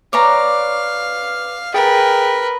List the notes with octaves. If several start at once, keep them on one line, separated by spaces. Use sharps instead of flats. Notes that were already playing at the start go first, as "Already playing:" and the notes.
B4 C#5 D5 F5 A#5 D6
G#4 A#4 B4 G5